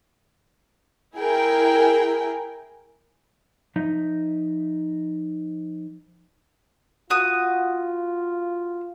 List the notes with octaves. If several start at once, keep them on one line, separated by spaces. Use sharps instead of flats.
E4 G#4 A#4 G5
F3 D#4 D#5 E5
F4 F#4 D#6